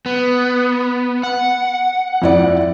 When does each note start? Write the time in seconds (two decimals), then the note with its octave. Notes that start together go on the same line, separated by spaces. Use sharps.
0.06 B3
1.23 F#5
2.22 F2 E4 D5